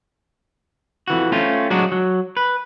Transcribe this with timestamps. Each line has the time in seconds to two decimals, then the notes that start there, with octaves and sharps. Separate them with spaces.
1.08 F2 E3 F#4
1.32 A3 C4 C#4 F4
1.70 F#3 G#3 D4 F#4
1.92 F#3
2.37 B4